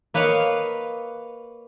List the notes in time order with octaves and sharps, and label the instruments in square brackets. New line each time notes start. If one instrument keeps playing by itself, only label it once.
[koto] A#3 B4 C#5 D#5 F5